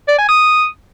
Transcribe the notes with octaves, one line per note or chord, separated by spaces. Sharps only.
D5
G#5
D#6